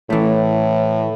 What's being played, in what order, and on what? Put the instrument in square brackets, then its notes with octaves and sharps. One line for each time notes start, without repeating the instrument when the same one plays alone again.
[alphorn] A2 [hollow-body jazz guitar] E3 A3